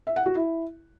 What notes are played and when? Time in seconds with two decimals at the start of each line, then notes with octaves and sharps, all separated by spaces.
0.07 E5
0.16 F#5
0.26 F#4
0.35 E4